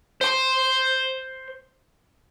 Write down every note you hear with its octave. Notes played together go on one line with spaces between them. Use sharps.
C5 C6